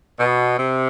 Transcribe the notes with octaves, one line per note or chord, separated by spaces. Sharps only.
B2
C3